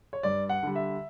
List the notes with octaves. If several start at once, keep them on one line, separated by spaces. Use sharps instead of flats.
C#5
G2 D5
F#5
D3 G3
E5